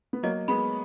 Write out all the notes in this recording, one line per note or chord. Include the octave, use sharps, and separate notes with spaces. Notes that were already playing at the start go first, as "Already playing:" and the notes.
B3
F#3 A#3 D#5
G#3 B3 B5